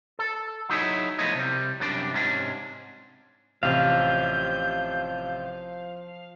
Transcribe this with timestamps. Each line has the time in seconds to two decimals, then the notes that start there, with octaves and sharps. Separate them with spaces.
0.19 A4
0.70 F#3 D#4 E4 G#4 C#5
1.19 F3 A3 B3 E4 C#5 D#5
1.35 C3 G3
1.80 F#2 C3 G3 D4 D5
2.14 G#2 C3 C#4 D4
3.63 A1 C3 F3 F5 G6